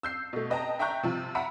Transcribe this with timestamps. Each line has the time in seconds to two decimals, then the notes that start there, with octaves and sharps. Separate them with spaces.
0.03 E6 G6 C7
0.33 B2 A3
0.50 B4 D#5 G5 A5 A#5
0.79 E5 G5 A#5 C#6 F#6 G6
1.03 C3 F3
1.35 E5 F#5 A#5 B5 E6 D7